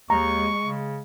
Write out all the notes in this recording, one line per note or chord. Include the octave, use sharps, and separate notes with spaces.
D#2 G#3 A#5 C#6
C#3